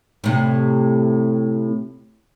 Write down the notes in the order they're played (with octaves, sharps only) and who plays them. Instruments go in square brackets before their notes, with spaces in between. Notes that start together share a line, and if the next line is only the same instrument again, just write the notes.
[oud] A2 C3